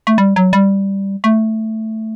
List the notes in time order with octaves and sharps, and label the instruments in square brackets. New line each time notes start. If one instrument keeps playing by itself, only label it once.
[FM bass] A3
G3
F#3
G3
A3